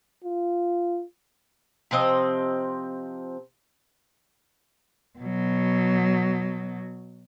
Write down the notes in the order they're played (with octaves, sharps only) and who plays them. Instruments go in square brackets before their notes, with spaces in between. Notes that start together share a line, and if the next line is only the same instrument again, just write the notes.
[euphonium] F4
[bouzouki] C3 F3 C4 D#5
[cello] B2 F#3